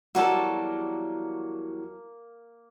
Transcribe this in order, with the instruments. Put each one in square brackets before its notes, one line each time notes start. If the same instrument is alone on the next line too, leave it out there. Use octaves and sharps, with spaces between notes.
[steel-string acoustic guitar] E2 F#3 G3 [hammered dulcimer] A#3 [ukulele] F#4 A4